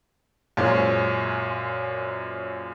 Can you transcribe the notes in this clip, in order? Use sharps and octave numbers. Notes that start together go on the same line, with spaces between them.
F#2 A#2 G#3 C#4 C5